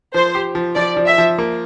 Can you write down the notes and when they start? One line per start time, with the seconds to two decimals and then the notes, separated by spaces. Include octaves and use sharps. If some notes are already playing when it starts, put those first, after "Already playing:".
0.14 F3 C5
0.35 G4
0.55 F3
0.76 F3 D5
0.97 F3
1.07 E5
1.18 F3
1.38 A#3